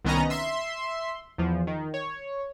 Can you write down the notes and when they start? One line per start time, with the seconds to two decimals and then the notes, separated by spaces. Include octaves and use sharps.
0.04 C2 D#3 B3 C#4 D#5 A#5
0.30 E5 C6
1.38 E2 F3
1.67 D#3
1.94 C#5